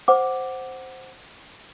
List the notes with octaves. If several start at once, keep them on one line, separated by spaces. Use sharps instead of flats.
C5 F#5 D6